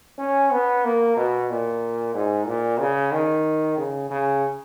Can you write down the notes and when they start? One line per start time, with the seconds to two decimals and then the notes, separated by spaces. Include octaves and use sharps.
0.19 C#4
0.51 B3
0.84 A#3
1.17 B2
1.50 A#2
2.14 G#2
2.46 A#2
2.79 C#3
3.12 D#3
3.77 C#3
4.10 C#3